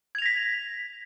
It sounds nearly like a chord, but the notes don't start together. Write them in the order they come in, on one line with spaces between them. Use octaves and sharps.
G#6 F7 A#6 B6